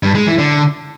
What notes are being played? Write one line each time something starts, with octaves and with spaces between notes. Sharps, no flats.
G2
G#3
E3
D3